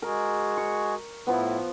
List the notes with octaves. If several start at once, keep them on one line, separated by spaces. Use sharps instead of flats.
G#3 F#4 G#4 A#4
C#6
A2 F3 B3 E4